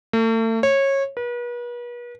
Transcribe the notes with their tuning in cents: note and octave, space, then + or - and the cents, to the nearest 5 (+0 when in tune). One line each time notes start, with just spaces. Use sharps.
A3 +40
C#5 -20
B4 -40